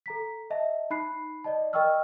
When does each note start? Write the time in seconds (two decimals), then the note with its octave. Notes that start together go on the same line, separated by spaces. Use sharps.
0.06 A4 A#5 B6
0.50 D#5 E5 A5
0.90 D#4 B5 F#6 C7
1.44 D5 D#5 A5
1.73 A#4 D#5 G5 C#6 E6 F6